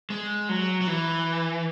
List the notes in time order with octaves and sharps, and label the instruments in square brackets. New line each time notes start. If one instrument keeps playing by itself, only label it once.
[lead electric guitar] G#3
F#3
F#3
E3